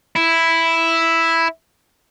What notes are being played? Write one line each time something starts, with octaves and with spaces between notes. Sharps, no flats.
E4